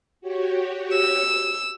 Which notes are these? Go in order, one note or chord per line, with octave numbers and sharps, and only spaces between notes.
F#4 G4 C#5
E6